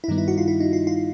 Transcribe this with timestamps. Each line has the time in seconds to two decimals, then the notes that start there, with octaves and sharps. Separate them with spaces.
0.04 E4
0.08 G2 D#3 G3 B3 D#4
0.18 E4
0.28 F#4
0.38 F4
0.48 E4
0.60 D#4
0.73 F4
0.87 F4